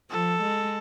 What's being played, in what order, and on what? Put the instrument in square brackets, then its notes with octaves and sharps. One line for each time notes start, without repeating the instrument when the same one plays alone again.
[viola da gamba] F3 [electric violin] A4
[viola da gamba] G#3